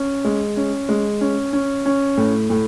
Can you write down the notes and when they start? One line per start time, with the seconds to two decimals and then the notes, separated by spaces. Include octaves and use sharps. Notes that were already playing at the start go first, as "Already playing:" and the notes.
Already playing: C#4
0.25 G#3
0.57 C#4
0.89 G#3
1.21 C#4
1.53 C#4
1.86 C#4
2.17 A2
2.50 A2